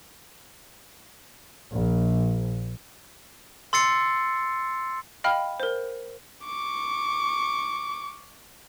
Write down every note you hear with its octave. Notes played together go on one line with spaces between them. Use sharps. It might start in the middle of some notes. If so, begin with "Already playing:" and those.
A#1
C6 E6 A6 C7 C#7
D#5 F5 G5 B5 F6
A#4 C5
C#6 D6